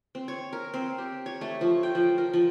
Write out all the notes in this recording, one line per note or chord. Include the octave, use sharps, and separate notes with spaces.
C4
C#5
A#4
C4
G4
C#5
A3
F3
G5
F3
A#4
F3